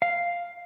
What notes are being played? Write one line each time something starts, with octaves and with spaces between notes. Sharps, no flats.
F5